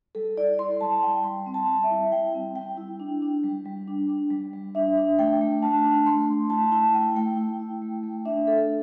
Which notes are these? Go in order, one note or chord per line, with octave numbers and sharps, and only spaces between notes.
G3 A4
E4 D5
E4 C6
G3 A5
G3 G5
G3 C6
C4
A5
G3
E5
E4
G3 G5
C4
G3 G5
E4
D4
D4
G3
G3
D4
D4
G3
G3
D4 E5
D4
A3 G5
A3
D4 A5
D4
A3 C6
A3
E4 A5
E4 A5
A3 G5
A3 G5
E4
E4
A3
A3
D4 E5
D4 A4